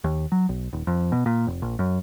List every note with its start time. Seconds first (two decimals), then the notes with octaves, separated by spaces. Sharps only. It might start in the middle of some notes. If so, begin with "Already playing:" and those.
0.04 D#2
0.32 F#3
0.49 B1
0.73 D#1
0.87 F2
1.12 B2
1.26 A#2
1.47 F1
1.62 A#1
1.79 F#2